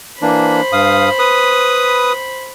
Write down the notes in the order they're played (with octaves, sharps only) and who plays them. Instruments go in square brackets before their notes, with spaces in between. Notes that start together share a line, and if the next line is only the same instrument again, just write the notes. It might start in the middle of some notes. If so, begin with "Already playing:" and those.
[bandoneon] E3 A#3 D4 [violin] C5 B5
[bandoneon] G2 F5 D#6
B4 D#6